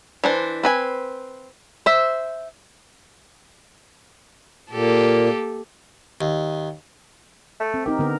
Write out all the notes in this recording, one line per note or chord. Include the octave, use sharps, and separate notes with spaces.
E3 D4 C5
C4 B4 G#5
C5 E5
A#2 A#3 G4 A4
D#2
A3
C4
C4 D#4 G4 A#4
D3 B3 A#4